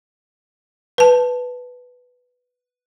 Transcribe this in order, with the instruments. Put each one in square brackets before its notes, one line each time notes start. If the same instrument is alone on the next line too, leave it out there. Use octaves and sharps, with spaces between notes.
[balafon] B4 A5